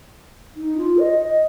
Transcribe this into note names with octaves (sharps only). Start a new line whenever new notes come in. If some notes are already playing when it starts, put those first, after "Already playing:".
D#4
F4
D#5
D#5